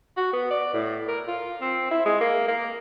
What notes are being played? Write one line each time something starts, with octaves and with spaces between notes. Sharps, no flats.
F#4
B3
D5
A2
A#4
F4
C4
E4
G#3
A#3
A#3